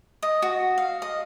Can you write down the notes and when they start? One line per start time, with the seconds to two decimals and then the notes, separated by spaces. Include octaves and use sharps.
0.22 D#5
0.42 F#4
0.78 F5
1.02 D#5